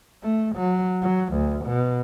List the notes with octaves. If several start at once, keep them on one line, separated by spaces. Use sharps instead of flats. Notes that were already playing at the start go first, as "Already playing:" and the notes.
A3
F#3
F#3
D2
B2